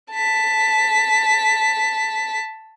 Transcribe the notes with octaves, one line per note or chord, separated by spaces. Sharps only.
A5 B6